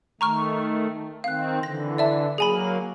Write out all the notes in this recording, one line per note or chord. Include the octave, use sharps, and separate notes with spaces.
D#3 A3 A#5 C#6 F6
D#3 C4 F5 F#6
D3 E3 A#6
D5 E5 A5
F#3 A#3 G#4 G#5 B5